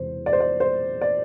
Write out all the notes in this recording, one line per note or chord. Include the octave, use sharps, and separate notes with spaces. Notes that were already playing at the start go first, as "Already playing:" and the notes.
Already playing: E1 E2 C3 E3 C5
D5
C5
D5
C5
D5